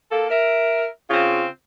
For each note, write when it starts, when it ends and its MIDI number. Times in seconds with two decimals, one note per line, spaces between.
0.10 0.29 58
0.10 0.29 69
0.30 0.86 70
0.30 0.86 76
1.10 1.46 49
1.10 1.46 60
1.10 1.46 65